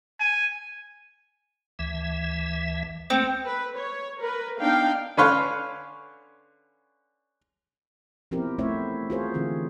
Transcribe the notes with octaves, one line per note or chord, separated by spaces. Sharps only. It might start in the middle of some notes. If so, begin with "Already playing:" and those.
G#5
D2 E3 E5
A3 A#3 C4
B4
C#5
A#4 B4
B3 D4 D#4 F5 G5
D3 C#4 B4 C#5 F5 C6
F3 B3 C4 E4 G4 A#4
A3 C4 E4 C5 C#5 E5
F4 F#4 G#4 A#4 C5 C#5
D3 E3 C4 F4